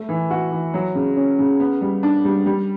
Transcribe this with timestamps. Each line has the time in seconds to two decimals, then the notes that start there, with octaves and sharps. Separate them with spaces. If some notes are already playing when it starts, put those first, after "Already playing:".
Already playing: A3
0.09 E3
0.31 F#4
0.51 E3
0.74 F#3
0.95 C#3
1.17 C#4
1.39 C#3
1.60 B3
1.81 G3
2.03 D4
2.25 G3
2.46 G3